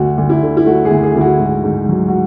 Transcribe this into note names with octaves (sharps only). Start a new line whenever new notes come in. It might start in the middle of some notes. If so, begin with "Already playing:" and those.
Already playing: D2 F#4
D2
E4
D3
E4
A3 F#4
G#4
D2
G#4
D2 E4
F#4
G#2
G#2
F#3
F#4